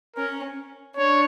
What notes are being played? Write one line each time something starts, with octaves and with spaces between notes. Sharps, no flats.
C#4 A#4
D4 C#5